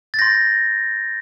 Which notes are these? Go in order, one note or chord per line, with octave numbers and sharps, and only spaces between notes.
A6
C6 G6 A#6